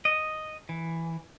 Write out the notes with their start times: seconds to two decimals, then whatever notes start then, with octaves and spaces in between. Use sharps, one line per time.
0.05 D#5
0.69 E3